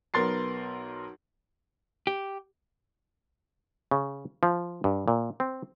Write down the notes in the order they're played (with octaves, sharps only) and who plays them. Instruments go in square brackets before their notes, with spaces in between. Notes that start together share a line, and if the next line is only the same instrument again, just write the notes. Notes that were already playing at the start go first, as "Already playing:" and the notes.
[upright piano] B1 B3 A#4 C6 A6 C7
[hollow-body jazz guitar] G4
[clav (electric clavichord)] C#3
F3
G2
A#2
C4